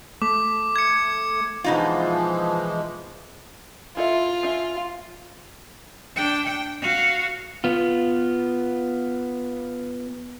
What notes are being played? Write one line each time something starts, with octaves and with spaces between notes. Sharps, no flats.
A3 D6
G#6 C#7
B2 E3 F3 G#3 D#4 F4
E4 F4 A4 E5
C#4 E5
D4 G5
G5
F#4 F5
B3 F4